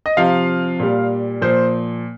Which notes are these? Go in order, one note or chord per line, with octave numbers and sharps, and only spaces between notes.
D#5
C3 F3 F5
A#2 G3
A#2 F3 C5